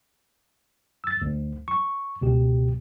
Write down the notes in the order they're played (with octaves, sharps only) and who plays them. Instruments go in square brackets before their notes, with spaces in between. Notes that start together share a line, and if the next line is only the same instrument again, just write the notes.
[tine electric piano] E6 A6
D2
C#6
C#2 B2 G4